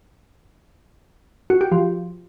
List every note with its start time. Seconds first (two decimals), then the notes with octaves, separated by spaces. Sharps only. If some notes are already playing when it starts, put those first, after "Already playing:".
1.50 F#4
1.61 G4
1.72 F3